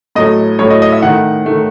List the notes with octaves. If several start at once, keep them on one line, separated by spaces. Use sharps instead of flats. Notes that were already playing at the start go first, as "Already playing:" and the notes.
A2 F#3 A3 D#5
A2 F#3 A3 C#5
D#5
D#5
E5
D#3 A3 F#5
D#3 A3